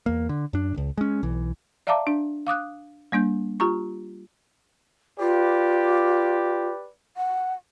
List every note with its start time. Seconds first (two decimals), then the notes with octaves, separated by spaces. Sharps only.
0.06 E2 A#3
0.29 D3
0.53 F#2 D4
0.74 D1 C#2
0.98 G#3 C#4
1.23 B1 E3
1.87 D5 E5 F5 A5 A#5 D6
2.07 D4
2.47 F5 D6 D#6 F#6
3.12 G3 A#3 D4 G6
3.60 F4 G4 A#5 C#6
5.20 F4 G4 B4 D5
7.17 F#5